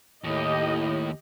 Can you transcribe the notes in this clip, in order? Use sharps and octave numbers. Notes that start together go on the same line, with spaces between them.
D#2 A2 G4 D#5